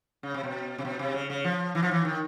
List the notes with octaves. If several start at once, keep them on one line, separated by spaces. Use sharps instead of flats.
C#3
C3
B2
C3
B2
C3
C#3
C#3
F3
E3
F3
E3
D#3